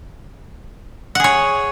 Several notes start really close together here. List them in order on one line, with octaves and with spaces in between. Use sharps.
F#5 G#4 C#5